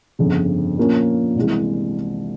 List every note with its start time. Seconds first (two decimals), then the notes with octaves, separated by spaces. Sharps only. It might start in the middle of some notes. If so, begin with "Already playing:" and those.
0.19 G1 F2 C#3
0.77 A#2 F3 A#3 C#4
1.36 C2 C3 E3 G#3